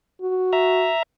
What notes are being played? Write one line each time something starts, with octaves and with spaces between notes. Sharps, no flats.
F#4
E5 A#5